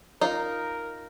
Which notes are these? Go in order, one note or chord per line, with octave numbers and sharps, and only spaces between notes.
D#4 F4 A#4